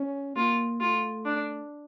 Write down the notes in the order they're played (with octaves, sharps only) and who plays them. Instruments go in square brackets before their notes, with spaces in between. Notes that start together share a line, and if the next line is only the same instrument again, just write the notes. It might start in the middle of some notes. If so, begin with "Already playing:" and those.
Already playing: [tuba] C#4
[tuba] A#3 [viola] F4
[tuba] A3 [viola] F4
[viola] D4